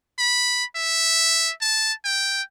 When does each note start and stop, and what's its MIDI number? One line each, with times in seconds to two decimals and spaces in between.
0.19 0.64 83
0.76 1.52 76
1.61 1.93 81
2.05 2.42 79